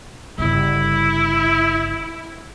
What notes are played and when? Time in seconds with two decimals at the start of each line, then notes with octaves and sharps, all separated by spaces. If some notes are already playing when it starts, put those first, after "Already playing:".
0.38 G1 C#3 E4